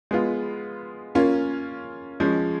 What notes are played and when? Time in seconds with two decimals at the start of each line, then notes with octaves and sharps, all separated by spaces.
0.11 G#3 B3 F4
1.15 A#3 C#4 F4
2.20 F3 G#3 C#4